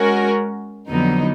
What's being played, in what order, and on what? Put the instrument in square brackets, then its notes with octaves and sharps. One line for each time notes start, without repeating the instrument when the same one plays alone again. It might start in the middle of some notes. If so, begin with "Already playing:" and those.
Already playing: [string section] G#3 C#4 F#4 A#4
F2 D3 F#3 B3 D#4